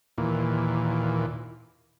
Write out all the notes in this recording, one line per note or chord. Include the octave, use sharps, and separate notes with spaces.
D#2 A#2 E3